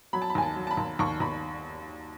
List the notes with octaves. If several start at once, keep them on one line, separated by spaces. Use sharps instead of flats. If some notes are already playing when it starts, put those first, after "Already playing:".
F#3 B5
A5
B5
D#2 G#5
A5
F#3
A5
B5
D#2
D#2 C#6
D#2 B5